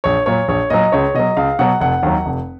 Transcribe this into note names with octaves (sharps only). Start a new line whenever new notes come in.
A#1 C#5
A#2 F#3 C#5
A#1 C#5
A#2 F#3 D#5
C#2 C#5
B2 F#3 D#5
C#2 F5
B2 F#3 F#5
F1 F#5
D#2 D#3 F#3
F1